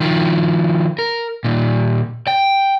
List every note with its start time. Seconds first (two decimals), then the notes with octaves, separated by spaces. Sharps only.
0.01 D#3 F3
0.99 A#4
1.44 A#2 D#3
2.27 G5